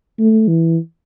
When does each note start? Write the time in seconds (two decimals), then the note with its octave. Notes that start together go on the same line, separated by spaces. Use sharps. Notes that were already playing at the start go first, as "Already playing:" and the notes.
0.19 A3
0.48 E3